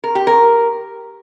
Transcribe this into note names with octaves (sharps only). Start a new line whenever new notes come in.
A#4
G4
A#4